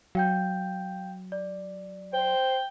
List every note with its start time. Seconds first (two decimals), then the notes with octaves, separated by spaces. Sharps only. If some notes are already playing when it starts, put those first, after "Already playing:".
0.15 F#3 F5 G5 G6
1.32 D5
2.14 C5 G5